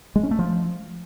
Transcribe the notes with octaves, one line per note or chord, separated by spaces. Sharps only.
G#3
C#4
A3
F3